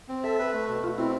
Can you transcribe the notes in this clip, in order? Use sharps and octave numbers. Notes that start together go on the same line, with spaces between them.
C4
A4 E5
B4
A3
B2
B2 F4
C4 E4